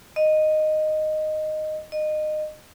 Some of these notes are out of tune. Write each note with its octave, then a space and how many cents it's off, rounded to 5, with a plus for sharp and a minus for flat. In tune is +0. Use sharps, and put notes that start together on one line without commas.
D#5 -10
D#5 -25